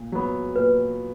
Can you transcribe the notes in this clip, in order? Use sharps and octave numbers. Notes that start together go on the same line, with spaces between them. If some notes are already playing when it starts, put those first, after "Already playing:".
Already playing: A#2
F#3 B3
A#2 B4